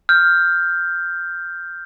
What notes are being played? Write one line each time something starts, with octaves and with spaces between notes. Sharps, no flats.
F6 G6